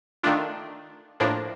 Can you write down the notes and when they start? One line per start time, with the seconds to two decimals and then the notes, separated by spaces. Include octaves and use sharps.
0.23 D#3 A3 D4 F4
1.20 A2 F3 A#3 D4